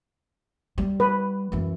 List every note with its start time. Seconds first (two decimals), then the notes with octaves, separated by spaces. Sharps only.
0.78 G3
1.00 B4
1.52 F#2 E3